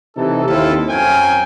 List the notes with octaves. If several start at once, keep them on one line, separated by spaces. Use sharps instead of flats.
C3 E3 D#4 A4
D#2 C4 E4 F4 A4
F#2 F#3 C4 F5 G5 G#5